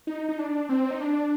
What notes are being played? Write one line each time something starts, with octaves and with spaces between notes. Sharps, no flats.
D#4
D#4
D4
C4
D#4
D4